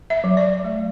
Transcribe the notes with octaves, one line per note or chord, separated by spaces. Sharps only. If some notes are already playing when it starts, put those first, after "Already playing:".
E5
F#3
D5
A3